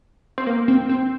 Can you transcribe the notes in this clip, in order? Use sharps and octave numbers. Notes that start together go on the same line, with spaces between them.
C4
A#3
C4
C4